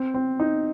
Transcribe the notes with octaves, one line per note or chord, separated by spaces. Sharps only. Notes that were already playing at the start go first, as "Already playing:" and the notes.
Already playing: C4
C4
D#4